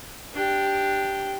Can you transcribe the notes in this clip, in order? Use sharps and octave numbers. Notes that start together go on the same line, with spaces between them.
D4 G4